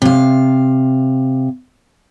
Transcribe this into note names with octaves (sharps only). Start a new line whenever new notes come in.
C3 F5